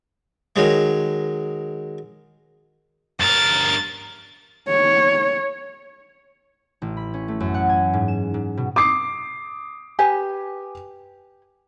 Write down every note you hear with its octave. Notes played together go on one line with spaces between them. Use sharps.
D#3 F#3 G#3
G2 A#4 A6
C#5
A1
B5
C#4
A3
F#2
F#5
G#5
G#2
E7
G#2
B2
D6 D#6 C7
G4 B4 G#5